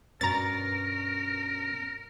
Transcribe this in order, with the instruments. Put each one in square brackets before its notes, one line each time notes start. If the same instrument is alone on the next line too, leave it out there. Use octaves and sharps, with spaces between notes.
[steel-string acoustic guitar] G2 B2 C#4 [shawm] A#4 [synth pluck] A#5 A6